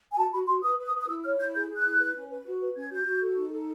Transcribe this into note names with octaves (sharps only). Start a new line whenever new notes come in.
G#5
F#4 A5
F#4 B5
F#4 C6
B4 D#6
B4
D#6
B4
D#6
E4 E6
C#5 F6
E4 G6
G#4 G6
G#4
F#6
E4
B4
C#4
B4
F#4
B4
C#4 G#6
F#4 G6
F#4
A4
D#4
A4